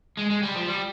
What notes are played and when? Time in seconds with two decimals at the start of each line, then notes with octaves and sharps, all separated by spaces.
0.17 G#3
0.30 G#3
0.43 G3
0.55 F3
0.68 G3